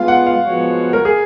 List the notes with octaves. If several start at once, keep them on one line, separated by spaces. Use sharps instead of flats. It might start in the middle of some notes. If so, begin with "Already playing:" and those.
Already playing: G#3 B3 F4 F5
F#5
F5
F3 G#3 B3 F#4 C#5
A#4
G#4